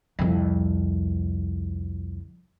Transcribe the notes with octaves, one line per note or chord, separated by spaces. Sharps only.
C2 F2